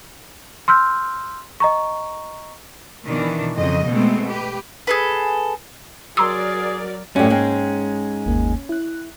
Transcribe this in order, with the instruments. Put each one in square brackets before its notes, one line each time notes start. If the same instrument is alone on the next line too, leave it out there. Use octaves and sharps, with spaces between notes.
[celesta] C6 E6 F6 G6
D#5 A#5 C#6
[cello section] B2 D#3 E3 D4
F2 C#3 D#5
B2 G#3 A3 B3 C4
G4 B4
[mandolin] G#4 A4 B4
[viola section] F#3 A#4 D5 [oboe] G#4 [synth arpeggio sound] A#5 C6 D6 [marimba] E6
[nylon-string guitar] F#2 A2 [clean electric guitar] C#4 [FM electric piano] G4 D5 G5
[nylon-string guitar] G#2 G#3 G5 [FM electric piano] A#3
[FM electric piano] G1 D#2 A#3
E4 F#6